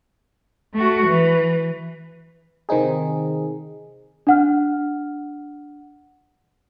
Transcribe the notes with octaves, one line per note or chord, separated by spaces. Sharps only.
A3 F#4
E3
C3 D#3 C4 D#4 G#4
D4 F#5 F6